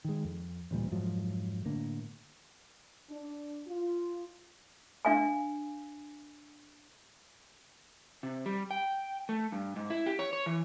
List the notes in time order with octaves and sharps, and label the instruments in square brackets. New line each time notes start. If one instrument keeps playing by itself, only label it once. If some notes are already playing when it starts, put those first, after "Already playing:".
[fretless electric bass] D#3 G#3
F2
A1 D2 A#2 G3
F2 G#2 F3 F#3
A2 D3 A#3
[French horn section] D4
F4
[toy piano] D4 F5 G#5
[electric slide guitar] C3
G3
G5
A3
G2
G#2
E4
G4
C#5
C#5
E3